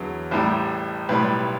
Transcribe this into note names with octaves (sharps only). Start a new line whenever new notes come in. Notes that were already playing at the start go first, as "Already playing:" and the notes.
Already playing: E2 D3 F#3
A1 A2 G3
B1 A2 G3 B4